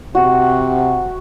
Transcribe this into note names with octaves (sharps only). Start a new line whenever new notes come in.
C3 F#4